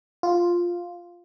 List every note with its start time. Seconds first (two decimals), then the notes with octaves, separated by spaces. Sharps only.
0.23 F4